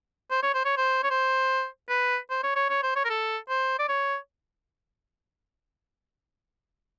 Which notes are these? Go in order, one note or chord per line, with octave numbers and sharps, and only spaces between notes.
C5
C#5
C5
C#5
C5
C#5
C5
B4
C5
C#5
C#5
C#5
C5
C#5
A#4
A4
C5
D5
C#5